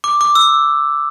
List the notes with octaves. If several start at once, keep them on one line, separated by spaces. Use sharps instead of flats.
D6
D6
E6